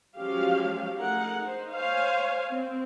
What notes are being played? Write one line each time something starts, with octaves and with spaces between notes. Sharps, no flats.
F3 F#3 G#3 C#4 G4 F5
A3 D#4 G#4 A#4 F#5
D#4 C5
C5 C#5 F5 G#5
C4